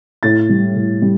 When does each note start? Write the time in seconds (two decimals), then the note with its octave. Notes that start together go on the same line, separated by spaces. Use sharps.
0.23 A2 A6
0.49 G3
0.75 A2
1.02 G3